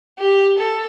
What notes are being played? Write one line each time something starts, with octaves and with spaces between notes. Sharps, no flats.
G4
A4